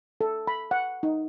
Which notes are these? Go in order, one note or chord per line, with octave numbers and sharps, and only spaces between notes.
A4
B5
F#5
D#4